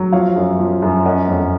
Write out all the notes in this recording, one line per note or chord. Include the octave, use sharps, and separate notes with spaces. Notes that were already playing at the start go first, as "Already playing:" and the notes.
Already playing: F#3
F3 C#5 F5
F#2
F3
F#2
C#4 D#5 F#5
F2